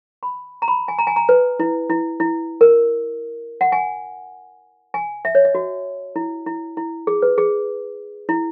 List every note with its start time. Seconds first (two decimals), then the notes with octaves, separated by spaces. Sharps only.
0.23 B5
0.62 A#5
0.68 B5
0.88 G#5
0.99 A#5
1.07 G#5
1.16 A#5
1.29 B4
1.60 E4
1.90 E4
2.20 E4
2.61 A#4
3.61 F#5
3.72 G#5
4.94 G#5
5.25 E5
5.35 C#5
5.45 D#5
5.55 F#4
6.16 E4
6.46 E4
6.77 E4
7.07 G#4
7.22 B4
7.38 G#4
8.29 E4